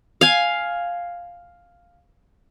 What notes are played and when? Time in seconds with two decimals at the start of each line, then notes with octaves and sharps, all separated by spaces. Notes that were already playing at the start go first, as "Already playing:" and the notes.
0.21 F5 G#5